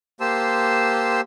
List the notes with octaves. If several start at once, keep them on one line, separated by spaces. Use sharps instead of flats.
A#3 G4 C5 A5 C6 E6